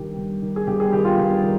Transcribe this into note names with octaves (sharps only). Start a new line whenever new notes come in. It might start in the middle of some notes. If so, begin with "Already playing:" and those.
Already playing: G2 D#3 G4
G2
D#3
G#4
G2 G4
G#4
D#3 G4
F4
G2
D#3